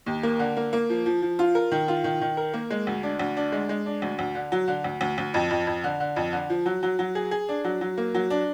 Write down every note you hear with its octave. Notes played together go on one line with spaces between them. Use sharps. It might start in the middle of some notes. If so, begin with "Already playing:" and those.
D#2
A#3
D3
A#3
A#3
F3
F3
F3
F4
A#4
D#3
F4
D#3
D#3
A#4
A#3
G#3
D2
D4
D2
D4
G#3
G#3
D4
D2
D2
D3
F#3
D3
D2
D2
D2
F2
F2
F2
D3
D3
F2
D3
F3
F#3
F#3
F#3
G#4
G#4
D4
F#3
F#3
A#3
F#3
D4